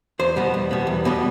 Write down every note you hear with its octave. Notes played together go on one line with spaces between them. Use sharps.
E2 C5
B2 G3 B3
E2
B2 G3 B3
E2
B2 G3 B3